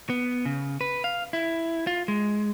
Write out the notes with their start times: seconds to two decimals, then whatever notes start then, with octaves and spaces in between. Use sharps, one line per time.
0.10 B3
0.45 C#3
0.81 B4
1.04 F5
1.33 E4
1.87 F4
2.08 G#3